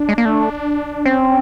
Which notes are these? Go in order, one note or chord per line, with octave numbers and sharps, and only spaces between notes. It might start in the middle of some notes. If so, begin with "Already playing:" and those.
Already playing: D4
G#3
A#3
A3
C4 C#4